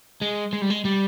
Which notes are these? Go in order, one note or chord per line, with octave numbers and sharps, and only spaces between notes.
G#3
G#3
G3
G#3
G3